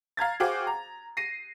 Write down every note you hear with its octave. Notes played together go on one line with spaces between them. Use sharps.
F5 A#5 G#6 A6
F#4 G#4 C5 F5 G5 D6
A#5
A#6 C7 D#7